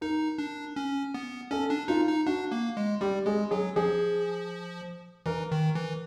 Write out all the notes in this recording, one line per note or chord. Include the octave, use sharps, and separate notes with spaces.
D#4 A#4
D4
C#4
B3
C#4 A4
D4
D#4 F4
D#4
D4 F#4
A#3
G#3
G3 G4
G#3 G#4
F#3 G#4
F3 G#4
E3 A#4
D#3
E3